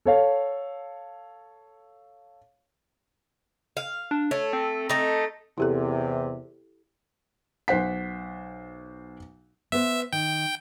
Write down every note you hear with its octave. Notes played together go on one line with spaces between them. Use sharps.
A4 C#5 F5
F5
D4
A3 C#5
C4
A3 D#4
E2 C3 E4 G4 A4
B1 C5 F#5 B6
B3 C5 E5
D#3 G5